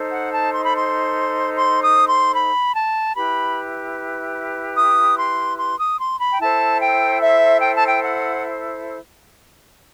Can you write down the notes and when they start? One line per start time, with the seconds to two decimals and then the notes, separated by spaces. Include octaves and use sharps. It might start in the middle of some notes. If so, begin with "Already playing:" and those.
Already playing: D#4 A4 C5
0.12 F#5
0.33 A5
0.53 C6
0.65 B5
0.76 C6
1.54 C6
1.82 D#6
2.08 C6
2.35 B5
2.75 A5
3.16 E4 G4 B4 B5
4.77 D#6
5.19 C6
5.59 C6
5.79 D#6
5.99 C6
6.20 B5
6.33 G5
6.40 E4 A4 C5 A5
6.80 G5
7.20 E5
7.61 G5
7.74 A5
7.87 G5
8.02 F#5